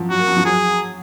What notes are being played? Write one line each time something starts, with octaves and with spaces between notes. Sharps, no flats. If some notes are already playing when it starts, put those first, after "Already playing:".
Already playing: F3 F#3
F#3 F#4
A#3
F#3
F3
F#3 G#4